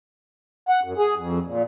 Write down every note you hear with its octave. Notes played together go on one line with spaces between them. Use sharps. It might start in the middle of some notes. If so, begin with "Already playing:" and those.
F#5
F#2
G#4
F2
A#2